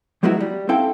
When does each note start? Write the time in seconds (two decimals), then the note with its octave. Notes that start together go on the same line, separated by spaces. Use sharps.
0.23 F3 F#3 G#3 B3 E4 F#4
0.41 G3
0.69 C4 E4 A4 F5 G5